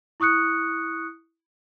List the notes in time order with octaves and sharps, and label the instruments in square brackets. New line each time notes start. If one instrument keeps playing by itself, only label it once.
[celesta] E4 C#6 D#6 F#6 C#7